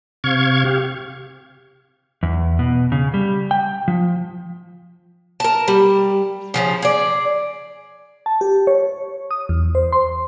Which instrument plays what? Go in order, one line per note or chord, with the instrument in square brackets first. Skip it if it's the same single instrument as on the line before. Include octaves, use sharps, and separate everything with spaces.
[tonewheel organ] C3 F5 C#6 G#6
G4 F5
[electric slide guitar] E2
B2
C#3
G3
G5
F3
[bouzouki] A#4 A5
G3
C#3 F3 C#4
G#4 D5
[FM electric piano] A5
G4
C#5
D#6
E2
C5
C6